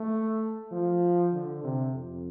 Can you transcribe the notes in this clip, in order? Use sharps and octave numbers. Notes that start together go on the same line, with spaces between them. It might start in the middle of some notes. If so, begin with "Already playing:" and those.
Already playing: A3
F3
D3
C3
F2